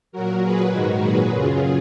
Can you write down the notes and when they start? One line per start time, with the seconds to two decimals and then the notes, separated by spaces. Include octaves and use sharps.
0.12 A#2 F#3 F#4 A#4
0.42 A#2 F#3 G#4 B4
0.72 G#2 D#3 G#3 F#4 A#4
1.01 A#2 F#3 G#4 B4
1.32 F#2 C#3 F#3 F4 G#4